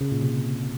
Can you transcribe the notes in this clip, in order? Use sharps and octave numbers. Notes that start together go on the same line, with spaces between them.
C#3
A#2
C3